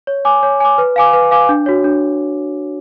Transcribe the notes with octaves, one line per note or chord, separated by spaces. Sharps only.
C#5
G#5 D6
C#5
G#5 D6
B4
F5 G#5 D6
B4
F5 G#5 D6
D4
F#4 C#5
D4